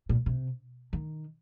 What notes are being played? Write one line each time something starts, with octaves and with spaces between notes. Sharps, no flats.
A#2
C3
D#3